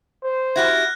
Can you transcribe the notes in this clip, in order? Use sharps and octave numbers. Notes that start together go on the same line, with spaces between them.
C5
E4 F#4 G4 F6 F#6 G#6 A#6